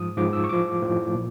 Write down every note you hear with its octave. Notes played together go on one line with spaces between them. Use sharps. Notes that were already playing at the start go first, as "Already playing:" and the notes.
Already playing: G#2 F3 D#6
G#2 F3 D6
E6
C#6
A2 F3 D6
A2 F3
A#2